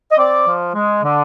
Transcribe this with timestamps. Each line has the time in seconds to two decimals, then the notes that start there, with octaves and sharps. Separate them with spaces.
0.11 D#5
0.17 C4 D5
0.47 F3
0.75 G#3
1.03 D3